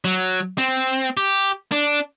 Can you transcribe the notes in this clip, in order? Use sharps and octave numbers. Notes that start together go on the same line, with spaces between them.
F#3
C4
G4
D4